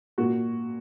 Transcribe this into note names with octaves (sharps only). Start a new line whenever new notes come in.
A#2 F#4